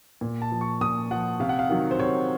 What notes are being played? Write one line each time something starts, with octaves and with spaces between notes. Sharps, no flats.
A#2
A5
F3
C#6
A#2 D#6
F3 F#5
C3 F5
F#5
F5
D#3 F#3
C5
C3 C#5